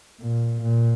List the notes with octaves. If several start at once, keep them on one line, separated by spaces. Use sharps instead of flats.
A#2
A#2